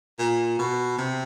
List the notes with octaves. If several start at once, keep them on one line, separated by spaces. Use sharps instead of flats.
A#2
B2
C3